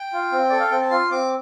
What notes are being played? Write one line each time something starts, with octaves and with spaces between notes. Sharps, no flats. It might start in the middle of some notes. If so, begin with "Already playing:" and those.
Already playing: G5
F4
C4
A4 D5
F5
C4 G5
A5
F4 C6
C4 D6